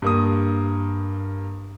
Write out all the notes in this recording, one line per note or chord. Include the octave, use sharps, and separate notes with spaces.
G2 A#3 D#6